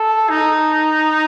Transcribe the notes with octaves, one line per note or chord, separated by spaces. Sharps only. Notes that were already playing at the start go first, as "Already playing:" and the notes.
Already playing: A4
D#4